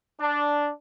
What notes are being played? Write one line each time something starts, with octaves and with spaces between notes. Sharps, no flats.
D4